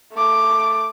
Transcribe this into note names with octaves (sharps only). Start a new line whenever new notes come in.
A3 D6